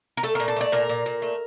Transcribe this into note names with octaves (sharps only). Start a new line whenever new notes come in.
A#4
A3 A4
A#2 A#4
A4
A3 D5
A#2 A#4
A#2
A#2
A3